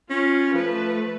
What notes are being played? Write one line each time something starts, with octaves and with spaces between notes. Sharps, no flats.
C#4 F4
F3 A3 B4